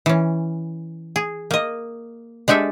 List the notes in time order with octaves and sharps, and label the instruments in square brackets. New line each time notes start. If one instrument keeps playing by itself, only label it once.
[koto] E3 C#4
G#4
A#3 D#5
G#3 D4 G4 A4 E5